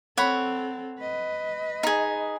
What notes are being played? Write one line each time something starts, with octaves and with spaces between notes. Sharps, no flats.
C4 A4 C#5 F#5 B5
B4 D#5
D#4 G#4